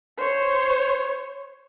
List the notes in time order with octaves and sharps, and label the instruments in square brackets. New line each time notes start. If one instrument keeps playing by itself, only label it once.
[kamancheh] C5 C#5